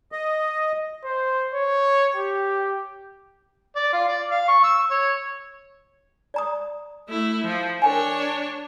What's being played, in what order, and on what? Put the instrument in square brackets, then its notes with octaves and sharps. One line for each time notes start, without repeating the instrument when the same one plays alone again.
[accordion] D#5
[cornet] C5
C#5
G4
[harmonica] D5
F4
D5
F5
C#6
E6
C#5
[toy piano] D5 A#5 D#6
[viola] A3 E4
F3
[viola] D4 C#5 [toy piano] A#4 G5 G#5